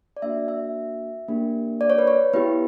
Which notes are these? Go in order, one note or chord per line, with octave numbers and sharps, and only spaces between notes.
D5
A#3 D4 F#4 E5
E5
A#3 D4 G4
D5
C#5
B4
C#5
B3 E4 G4 B4